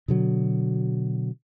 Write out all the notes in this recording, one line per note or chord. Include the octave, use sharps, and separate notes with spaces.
B2 D3 F#3